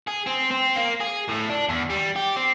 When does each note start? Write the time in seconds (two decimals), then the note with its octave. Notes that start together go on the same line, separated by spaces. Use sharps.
0.08 G#4
0.27 C4
0.51 C4
0.76 A#3
1.01 G#4
1.29 A2
1.50 D4
1.69 E2
1.90 G3
2.16 G4
2.36 C4